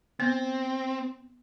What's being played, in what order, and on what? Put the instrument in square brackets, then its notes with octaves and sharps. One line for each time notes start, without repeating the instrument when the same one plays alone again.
[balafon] B3 [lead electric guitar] C4